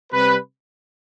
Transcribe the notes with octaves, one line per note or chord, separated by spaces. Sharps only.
C3 G3 C4 B4